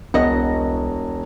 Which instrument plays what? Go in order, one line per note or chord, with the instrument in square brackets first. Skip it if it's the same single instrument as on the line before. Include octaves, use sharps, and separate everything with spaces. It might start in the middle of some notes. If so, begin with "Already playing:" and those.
[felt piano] E1 [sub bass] C2 [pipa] F#4 D#5